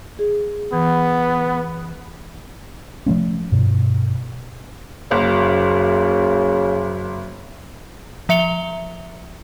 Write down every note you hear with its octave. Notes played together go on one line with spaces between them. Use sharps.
G#4
E3 B3
F3 F#3 A3 C#4
G2 B2
F#1 F#2 C#3
F3 E5 C#7 F7 G7